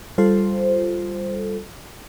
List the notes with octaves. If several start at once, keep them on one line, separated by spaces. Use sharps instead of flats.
G3 F4 A4 C5